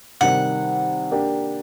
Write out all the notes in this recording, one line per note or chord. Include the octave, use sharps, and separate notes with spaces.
C3 D#3 G3 F#5
A#3 D4 G4